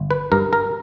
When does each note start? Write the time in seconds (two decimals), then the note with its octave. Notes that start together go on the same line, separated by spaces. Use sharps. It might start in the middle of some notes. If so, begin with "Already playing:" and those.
Already playing: G1
0.11 B4
0.32 G2 A#4
0.53 A#4